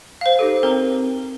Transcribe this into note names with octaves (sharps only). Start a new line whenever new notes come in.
C5 F5
D#4 G4 A4
C4 A#4 A#5